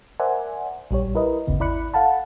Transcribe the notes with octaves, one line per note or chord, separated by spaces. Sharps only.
A#4 C5 D5 E5 F#5 G#5
A#1 G3 G4 C#5
E4 A#4 B4 D#5
G1 D#2 C#3 B3
G#1 E4 D5 B5 F#6 C#7
A4 F5 F#5 A5 B5